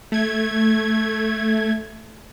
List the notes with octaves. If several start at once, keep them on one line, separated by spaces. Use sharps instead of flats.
A3 G#6